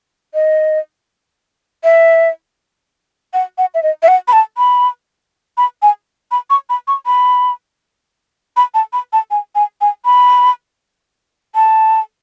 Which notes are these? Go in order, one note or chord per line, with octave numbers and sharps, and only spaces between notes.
D#5
E5
F#5
F#5
E5
D#5
E5
F#5
B5
A5
B5
B5
G#5
B5
C#6
B5
C#6
B5
B5
A5
B5
A5
G#5
G#5
G#5
B5
A5